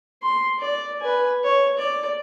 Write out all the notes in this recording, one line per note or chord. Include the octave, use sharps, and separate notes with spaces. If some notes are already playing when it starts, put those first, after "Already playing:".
C6
D5
B4 G#5
C#5
D5